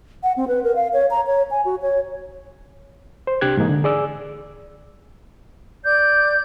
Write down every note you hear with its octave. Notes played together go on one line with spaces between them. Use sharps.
F#5
C4
B4
A#4
F5
C#5
A#5
C#5
G#5
F#4
C#5
C5
C2 C3 D4 G4 F#6 G#6
G#2 E3 A#3 D#4
D3
G#4 D5 E6
D5 G6